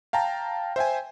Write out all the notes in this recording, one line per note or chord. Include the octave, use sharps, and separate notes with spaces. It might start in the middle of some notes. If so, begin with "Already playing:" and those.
F5 G5 A5 A#5
C5 E5 G5 G#5